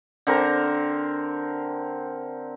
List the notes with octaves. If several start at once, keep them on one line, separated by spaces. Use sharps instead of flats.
D3 C4 A#4